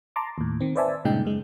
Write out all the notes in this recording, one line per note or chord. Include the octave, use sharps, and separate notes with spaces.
A5 A#5 C6 D6
D#2 A2
D#3 C4
B4 C5 D5 E5 G#5 A5
G2 A#2 C#3 G#3 D#4 G5
F#2 G#3